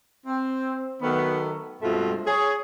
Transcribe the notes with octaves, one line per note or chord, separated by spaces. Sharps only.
C4
D#3 F#3 A3 B3
G2 B2 G#3 A3 C4 F4
G#4 C#5